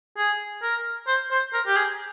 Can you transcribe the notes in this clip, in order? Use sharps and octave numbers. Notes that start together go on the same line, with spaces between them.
G#4
A#4
C5
C5
A#4
G4
G#4